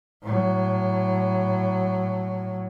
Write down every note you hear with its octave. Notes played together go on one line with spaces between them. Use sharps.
A2 F#3